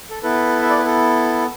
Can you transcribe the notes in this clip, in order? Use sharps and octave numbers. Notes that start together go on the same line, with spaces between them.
A4
B3 E4 A4 B4
E5
D5
B4
A4